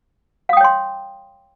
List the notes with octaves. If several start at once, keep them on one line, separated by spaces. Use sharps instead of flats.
C#5 F5 G5 C6 D#6